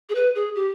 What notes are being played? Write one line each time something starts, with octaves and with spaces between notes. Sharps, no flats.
G#4
B4
G#4
G4